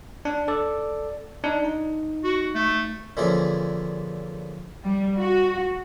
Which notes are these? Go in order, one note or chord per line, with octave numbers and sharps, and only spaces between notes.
D4
A4 D5
D4 D#4
D#4
F#4
A3
A#2 D3 E3 F3 C#4 G#4
G3
F#4